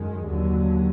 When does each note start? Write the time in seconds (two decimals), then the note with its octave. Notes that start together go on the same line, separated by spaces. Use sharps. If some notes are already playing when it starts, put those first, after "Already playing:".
Already playing: F#2 D#3 G#3
0.26 D#2 D3 F#3